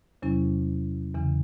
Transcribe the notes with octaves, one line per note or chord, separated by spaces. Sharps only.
E2 C3 F#3 C#4 E4
E2 C#3 E3